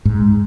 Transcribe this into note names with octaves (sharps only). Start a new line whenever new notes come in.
G#2